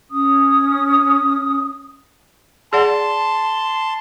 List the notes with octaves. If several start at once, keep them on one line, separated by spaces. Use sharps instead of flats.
C#4 D#6
G#4 D5 F#5 A5 C6